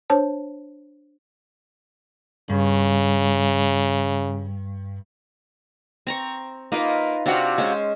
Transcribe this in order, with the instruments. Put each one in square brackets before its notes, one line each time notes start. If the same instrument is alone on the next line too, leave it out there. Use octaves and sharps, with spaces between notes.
[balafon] D4 C5 C#5 A5
[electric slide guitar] G2 [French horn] C#3
[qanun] C4 A#5 C#6
[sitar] A#3 [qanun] D#4 F4 B4
[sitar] C3 F4 F#4 [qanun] C4 D4
[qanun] G#3 C#4 C5